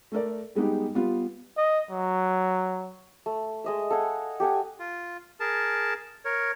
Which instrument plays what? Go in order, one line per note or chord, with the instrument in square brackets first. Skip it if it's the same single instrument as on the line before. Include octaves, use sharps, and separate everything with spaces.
[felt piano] A3 A4 A#4 D5
G3 G#3 B3 D#4 G4
G3 B3 F4
[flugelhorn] D#5
F#3
[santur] A3
G#3 D#5 E5
A4 F5 F#5 G#5
G4 A4 F#5 G#5
[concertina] F4
G#4 A#4 A5
A#4 C#5